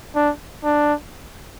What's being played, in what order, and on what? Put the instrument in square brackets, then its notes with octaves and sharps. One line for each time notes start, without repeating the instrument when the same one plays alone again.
[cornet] D4
D4